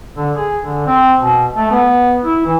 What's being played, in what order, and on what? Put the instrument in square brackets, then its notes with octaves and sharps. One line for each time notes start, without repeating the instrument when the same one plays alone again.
[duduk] D3
G#4
D3
C4
B2
A3
B3
E4
E3